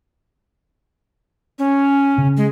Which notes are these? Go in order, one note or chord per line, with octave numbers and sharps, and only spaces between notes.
C#4
C#3
G#3